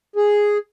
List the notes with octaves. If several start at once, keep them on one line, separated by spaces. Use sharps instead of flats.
G#4